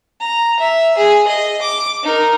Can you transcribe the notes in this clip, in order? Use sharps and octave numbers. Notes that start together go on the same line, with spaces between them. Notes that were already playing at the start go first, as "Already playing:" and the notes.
A#5
E5
G#4
D#5
D6
D#4 A#4